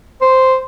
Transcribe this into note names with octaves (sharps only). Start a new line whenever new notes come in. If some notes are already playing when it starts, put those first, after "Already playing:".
C5